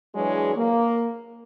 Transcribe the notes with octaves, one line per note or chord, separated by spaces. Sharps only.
E3 F#3 G#3 D4 G#4 C#5
A#3